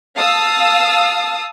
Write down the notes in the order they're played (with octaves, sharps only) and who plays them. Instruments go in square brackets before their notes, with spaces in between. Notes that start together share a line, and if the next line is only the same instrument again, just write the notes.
[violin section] F5 A5 D#6 E6